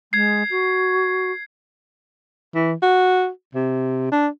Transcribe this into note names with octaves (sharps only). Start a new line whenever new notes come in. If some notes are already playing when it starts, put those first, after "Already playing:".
G#3 G#6 C7
F#4
E3
F#4
C3
D4